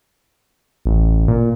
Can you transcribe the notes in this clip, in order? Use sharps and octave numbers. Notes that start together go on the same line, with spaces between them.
A1
A#2